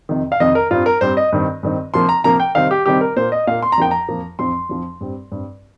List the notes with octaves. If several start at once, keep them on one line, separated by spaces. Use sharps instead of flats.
F2 C3 D#3
F5
F2 C3 D#3 D#5
A#4
G2 G3 C4 F4
A#4
G2 G3 C4 C5
D#5
G2 D#3 C4
G2 D#3 C4
C3 F3 A#3 C6
A#5
C3 F3 A#3 A#5
G5
C3 D#3 G3 C4 F5
G4
C3 D#3 G3 C4 G4
A#4
A#2 A#3 C5
D#5
A#2 A#3 F5
C6
A#5
F2 F3 A#3 G5
A#5
F2 F3 A#3
F2 F3 C4 C6
F2 F3 C4
G2 G3 C4
G2 G3 C4